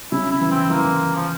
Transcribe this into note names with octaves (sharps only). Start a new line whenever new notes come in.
C#3 E4
E4
E3
C4
E3 A#3
F3